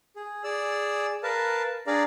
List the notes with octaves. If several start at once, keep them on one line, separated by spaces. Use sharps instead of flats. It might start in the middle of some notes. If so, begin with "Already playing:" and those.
G#4
G#4 D5 E6
A#4 B4 F5 A5
D4 G#4 D5 F5 A#5